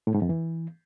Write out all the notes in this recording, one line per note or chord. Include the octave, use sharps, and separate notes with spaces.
A2
G#2
F2
E3